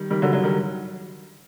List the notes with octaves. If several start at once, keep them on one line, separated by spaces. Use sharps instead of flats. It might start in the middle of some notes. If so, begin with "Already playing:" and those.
Already playing: D#3 G3
D#3 G3
D3 F#3
D3 F#3
D#3 G3